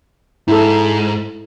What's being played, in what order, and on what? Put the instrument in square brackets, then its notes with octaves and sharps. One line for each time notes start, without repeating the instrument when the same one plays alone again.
[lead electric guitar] G#2 [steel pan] E4 A4